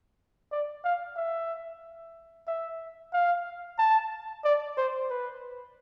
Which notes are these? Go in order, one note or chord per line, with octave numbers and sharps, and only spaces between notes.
D5
F5
E5
E5
F5
A5
D5
C5
B4